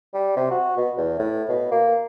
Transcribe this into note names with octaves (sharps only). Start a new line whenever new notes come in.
G3
C3
F#4
B2
E2
A2
B2
A#3